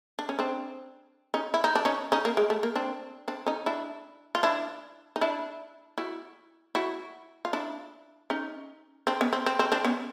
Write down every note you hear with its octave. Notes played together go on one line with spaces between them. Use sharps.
D4
C#4
C4 D4
C#4 D#4
E4
D#4
D4
C#4 D#4
C#4 D#4
A#3
G#3
A3
A#3
C4 D4
C4 D4
C#4 D#4
D4 E4
F4
D4 E4
D#4
D4 E4
E4 F#4
E4 F#4
F4
D4 E4
C#4 D#4
C4 D4
B3 C#4
C4
C4
C4
C4 D4
B3 C#4